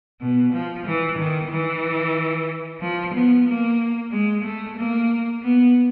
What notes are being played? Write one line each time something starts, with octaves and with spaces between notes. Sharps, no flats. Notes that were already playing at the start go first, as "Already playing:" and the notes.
B2
F3
E3
D#3
E3
F3
B3
A#3
G#3
A3
A#3
B3